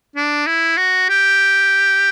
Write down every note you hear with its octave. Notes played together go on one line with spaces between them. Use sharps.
D4
E4
F#4
G4